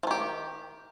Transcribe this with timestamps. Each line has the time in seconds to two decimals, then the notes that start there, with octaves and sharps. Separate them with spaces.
0.03 F3
0.07 D#3
0.11 G4